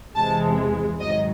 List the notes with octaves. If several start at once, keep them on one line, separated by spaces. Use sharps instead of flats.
E2 C3 E3 G#3 A5
G#2 D#3 F#3 D#5